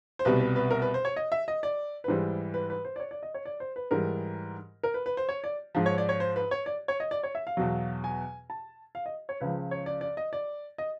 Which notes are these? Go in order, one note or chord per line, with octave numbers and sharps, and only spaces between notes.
C5
C2 B2 G3 B4
B4
B4
A#4
B4
C5
C#5
D#5
E5
D#5
D5
B4
G#2 E3 G3 C5
B4
B4
C5
D5
C#5
D5
D#5
C#5
D5
C5
B4
G#2 E3 G3 A#4
A#4
B4
B4
C5
C#5
D5
G#2 F3
C#5
D5
C#5
C5
B4
C#5
D5
C#5
D#5
D5
C#5
E5
F5
E2 B2 F#3
G#5
A5
F5
D#5
C#5
C#2 C#3 F3 B4
C#5
D5
D5
D#5
D5
D#5